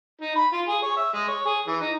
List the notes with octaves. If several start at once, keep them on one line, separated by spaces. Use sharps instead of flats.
D#4
B5
F4
G#4
C#5
E5
G#3
C#5
G#4
E3
D#4